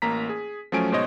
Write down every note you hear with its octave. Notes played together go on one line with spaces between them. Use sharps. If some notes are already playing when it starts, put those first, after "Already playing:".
A1 A#3 A#5 B6
G#4
F3 F#3 A3 C#4 G#5 D7
G#2 B2 C5 C#5 D#5